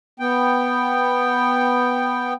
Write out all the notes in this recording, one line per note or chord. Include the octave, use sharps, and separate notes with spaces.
B3 G5